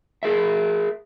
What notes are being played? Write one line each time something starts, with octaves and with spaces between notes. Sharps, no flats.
G#4 A#4 E5